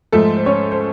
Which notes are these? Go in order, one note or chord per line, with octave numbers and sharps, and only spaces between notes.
G#2 F3 G#3 A3 A4
C5
C#4 C#5
C5